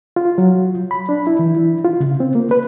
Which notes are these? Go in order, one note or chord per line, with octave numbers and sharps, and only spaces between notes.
F4
F#3
B5
D4
E4
E3
E4
F4
C#3
C4
A#3
B4